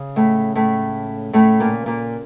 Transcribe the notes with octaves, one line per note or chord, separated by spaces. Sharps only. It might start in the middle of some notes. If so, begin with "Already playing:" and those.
Already playing: C#3 C#4
A2 A3
A2 A3
A2 A3
A#2 A#3
A#2 A#3